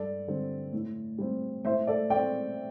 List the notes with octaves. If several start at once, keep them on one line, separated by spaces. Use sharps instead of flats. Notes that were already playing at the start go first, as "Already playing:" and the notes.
Already playing: G2 A4 D5
D3 G3 C4
A2
G3 C4
A2 C5 E5
A4 D5
A3 C4 D5 G5